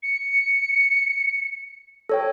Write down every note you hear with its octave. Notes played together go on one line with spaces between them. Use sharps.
C#7
A4 C#5 G5